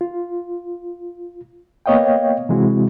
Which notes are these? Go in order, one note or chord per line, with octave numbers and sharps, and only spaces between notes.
F4
A#3 B3 C#5 D#5 F5 G5
C3 E3 G#3 C4 E4 F#4